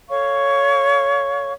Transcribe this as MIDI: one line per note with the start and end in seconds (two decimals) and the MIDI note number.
0.09 1.52 69
0.09 1.52 73
0.09 1.52 77
0.09 1.52 85